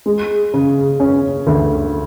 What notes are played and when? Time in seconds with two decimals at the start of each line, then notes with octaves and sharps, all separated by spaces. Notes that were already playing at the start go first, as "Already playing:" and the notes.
0.06 G#3
0.54 C#3
1.00 C#4
1.47 D2